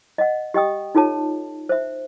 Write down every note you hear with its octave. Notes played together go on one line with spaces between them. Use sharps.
D#5 F#5
G4 D#5 G5 D#6
D#4 F4 A4 C#5 A5
C5 E5